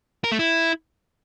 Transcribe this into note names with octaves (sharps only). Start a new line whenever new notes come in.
A#4
A3
E4